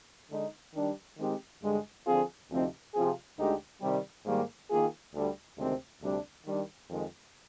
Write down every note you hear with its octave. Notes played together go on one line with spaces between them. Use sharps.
D3 G#3 D#4
D#3 G3 D4
D#3 G#3 C4 D#4 G4
G2 D3 G#3
D3 F3 C4 F4 G#4
D2 C3 F3 C4 D#4
C3 F3 C4 F4 G#4
D2 D3 G#3 D#4 G4
C3 D#3 G3
G#2 D#3 G3 A#3
D#3 A#3 F4 G#4
D2 D3 G3
D2 C3 D#3 G#3 C4
D2 C3 G3 D4
D#3 G3 D4
F2 D#3 G#3